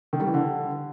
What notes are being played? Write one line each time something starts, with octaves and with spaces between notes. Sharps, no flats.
D#3
G3
E3
D3